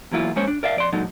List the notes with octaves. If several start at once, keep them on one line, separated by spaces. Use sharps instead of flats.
E2 F#3 A#3 E4 F4
G#3 A#3 C#4 C5 C#5
D4
A#4 D5 E5 F5
F2 D5 C6
A#2 F#3 G#3 D#4 A4